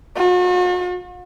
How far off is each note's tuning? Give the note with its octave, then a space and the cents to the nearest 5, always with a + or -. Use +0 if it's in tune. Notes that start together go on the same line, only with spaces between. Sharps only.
F#4 -45